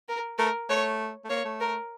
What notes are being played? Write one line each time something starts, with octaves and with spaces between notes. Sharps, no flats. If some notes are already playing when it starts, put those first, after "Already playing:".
A#4
A3 A#4
A3 C#5
A3
A#3 C#5
A3
A#4